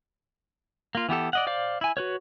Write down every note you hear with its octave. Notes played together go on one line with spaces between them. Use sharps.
A#3 F4
E3 B3 G4 A4
D5 D#5 F#5
C5 D5 F5 D6
E4 G#5
F#4 B4 C#5